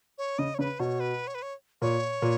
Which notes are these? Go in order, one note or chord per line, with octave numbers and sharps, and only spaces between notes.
C#5
C#3 D#5
C#5
C#3 B4
B2 C#5
B4
C#5
B4
C#5
A#2 C#5
A#2